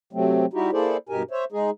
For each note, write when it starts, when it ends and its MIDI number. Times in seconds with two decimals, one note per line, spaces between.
0.13 0.46 48
0.13 0.46 54
0.13 0.46 57
0.13 0.46 60
0.53 0.71 55
0.53 0.71 63
0.53 0.71 64
0.53 0.71 66
0.53 0.71 67
0.73 0.97 58
0.73 0.97 64
0.73 0.97 68
0.73 0.97 69
0.73 0.97 72
0.73 0.97 74
1.09 1.23 43
1.09 1.23 47
1.09 1.23 63
1.09 1.23 67
1.09 1.23 70
1.09 1.23 80
1.31 1.45 72
1.31 1.45 73
1.31 1.45 76
1.52 1.70 56
1.52 1.70 63
1.52 1.70 68